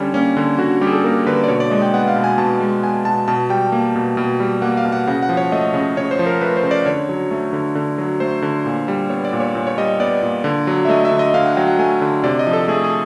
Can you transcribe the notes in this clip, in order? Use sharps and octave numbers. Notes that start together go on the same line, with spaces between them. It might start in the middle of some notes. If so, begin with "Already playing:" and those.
Already playing: D3 G3 C#4
A#3 C#4
D3
D3 F#4
G3 G4
G#4
A4
A#3 A#4
D3 B4
D5
B2 C#5
D5
G#3 D#5
G5
B3 F#5
F5
B2
G#5
B2 A5
G#3
B3 G#5
B2 A5
B2 A5
G3 G5
A#3
B2
B2
G3
A#3 F#5
F5
B2
F#5
C#3 F#5
F#5
F3
C#5
A3 D#5
C#3
C#3 C#5
C5
F3
A#4
A3 B4
C5
C#3
D5
D3 C#5
F#3
A3
D3
D3
F#3
A3 C5
D3
A#2
G3
B3 C#5
D5
A#2
C#5
A#2
C#5
G3 D#5
B3 D5
A#2
D3
F#3
E5
A3 D#5
E5
D3
D#5
D3 F5
F#5
F#3 G5
F#5
A3 G#5
D3
C3 D5
D#5
F3
A4
A3 G#4
G#4